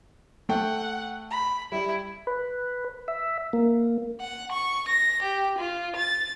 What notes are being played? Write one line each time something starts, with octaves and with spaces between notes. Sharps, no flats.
A3 F#5 G5
B5
G3 E4
B4
E5
A#3
F#5
C#6
A#6
G4
F4
A6